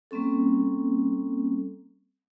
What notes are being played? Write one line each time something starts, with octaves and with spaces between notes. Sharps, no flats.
G3 A#3 C4 C#4 A4